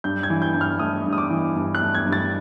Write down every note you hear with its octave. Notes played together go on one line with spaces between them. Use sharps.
G2 G6
G#6
E3
G6
G2
F6
A3 D#6
G2
D#6
D6
E3
G2
F#6
A3
G#6
G2
A6